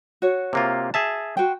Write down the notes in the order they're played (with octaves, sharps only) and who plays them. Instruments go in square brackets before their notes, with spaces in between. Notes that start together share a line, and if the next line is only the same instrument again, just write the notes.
[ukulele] F#4 C#5
[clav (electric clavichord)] C3 A#3 F4
G#4 E5 A5
[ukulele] F#4 C5 G5